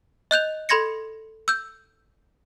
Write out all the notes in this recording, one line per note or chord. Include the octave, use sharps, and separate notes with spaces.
D#5 F#6 G6 F7
A4 B5 C6 G#6 A#6 C#7
E6 G6